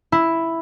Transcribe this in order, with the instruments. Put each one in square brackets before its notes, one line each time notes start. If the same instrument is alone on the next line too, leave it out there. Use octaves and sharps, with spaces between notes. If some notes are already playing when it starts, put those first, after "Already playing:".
[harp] E4